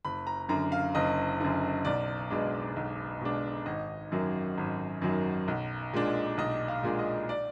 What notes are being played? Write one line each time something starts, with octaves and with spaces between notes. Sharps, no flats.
F#1 B5
A#5
F#2 D3 A#5
F5
F#1 D#5
F#2 D3
B1 D5
B2 G#3 D4
B1
B2 G#3 D4
G#1 D#5
F#2 D#3 F#3
G#1
F#2 D#3 F#3
B1
A#2 G#3 D4
B1 D#5
F5
A#2 G#3 D4
D#5
D5